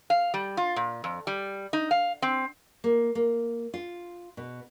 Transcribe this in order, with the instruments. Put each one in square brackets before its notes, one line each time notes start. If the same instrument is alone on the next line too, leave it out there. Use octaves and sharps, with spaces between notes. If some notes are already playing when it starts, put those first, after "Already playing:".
[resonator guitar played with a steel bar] F5
G3
F4
A#2
F2
G3
D#4
F5
C4
[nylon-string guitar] A#3
A#3
F4
B2